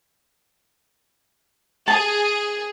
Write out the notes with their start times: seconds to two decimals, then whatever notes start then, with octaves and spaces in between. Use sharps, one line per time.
1.88 G#4 A5